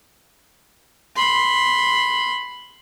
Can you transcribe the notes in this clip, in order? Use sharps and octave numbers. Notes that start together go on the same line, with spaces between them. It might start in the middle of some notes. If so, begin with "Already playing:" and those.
B5 C6